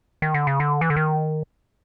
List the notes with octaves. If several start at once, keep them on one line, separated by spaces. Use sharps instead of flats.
D#3
D3
C#3
D3
E3
D3
D#3